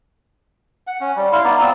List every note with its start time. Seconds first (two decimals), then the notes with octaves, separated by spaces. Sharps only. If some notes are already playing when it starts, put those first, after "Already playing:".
0.87 F#5
1.01 C#4
1.16 G3
1.32 E4 F5 C6
1.44 B3 D#4 D5
1.61 C4 F4 E6